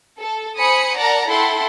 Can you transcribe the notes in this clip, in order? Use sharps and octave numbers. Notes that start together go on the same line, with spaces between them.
A4
C5 G#5 B5 D#6 C#7
A#4 D5 F#5 A5 A#5
E4 A4 F#5 G5 C6